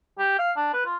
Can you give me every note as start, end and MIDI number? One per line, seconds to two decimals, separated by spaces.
0.19 0.36 67
0.39 0.51 77
0.57 0.70 62
0.73 0.85 71
0.85 0.96 65